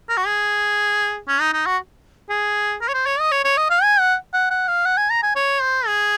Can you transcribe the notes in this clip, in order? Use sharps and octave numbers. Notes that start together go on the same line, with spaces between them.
A#4
F#4
G#4
C#4
D#4
D#4
F#4
G#4
A#4
C#5
C5
C#5
D#5
C#5
C#5
D#5
F5
G#5
F#5
F#5
F#5
F5
F#5
G#5
A#5
G#5
C#5
C5
G#4